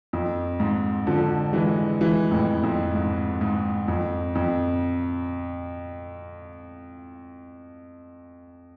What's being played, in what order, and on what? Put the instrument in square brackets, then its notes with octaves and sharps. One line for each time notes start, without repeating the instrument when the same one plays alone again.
[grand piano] F2
G#2
D3 F3
E3 G#3
E3 G#3
F2 A2
F2
G#2
G#2
F2
F2